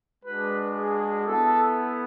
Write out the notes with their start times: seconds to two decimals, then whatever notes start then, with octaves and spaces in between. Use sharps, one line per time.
0.24 G#3 D4 F#4 B4
0.75 G#4
1.26 B3 E4 A4